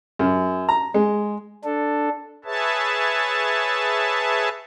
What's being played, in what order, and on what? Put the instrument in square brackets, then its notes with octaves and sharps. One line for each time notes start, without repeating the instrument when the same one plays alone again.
[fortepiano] F#2
A#5
G#3
[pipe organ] D4 A4
G#4 B4 C#5 E5 A5